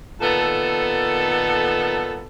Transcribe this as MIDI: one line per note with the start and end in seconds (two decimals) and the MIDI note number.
0.21 2.26 46
0.21 2.26 51
0.21 2.26 59
0.21 2.26 69